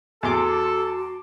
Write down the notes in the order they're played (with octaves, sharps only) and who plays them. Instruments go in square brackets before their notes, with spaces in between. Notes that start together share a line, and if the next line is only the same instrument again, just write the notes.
[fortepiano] E2 [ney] F#4 [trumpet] A4 [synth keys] A5 C6 D6